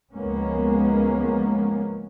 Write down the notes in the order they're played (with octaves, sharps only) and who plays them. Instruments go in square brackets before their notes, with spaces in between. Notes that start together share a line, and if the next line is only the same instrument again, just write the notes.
[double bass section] C#2 F3 G#3 A#3 B3 C#4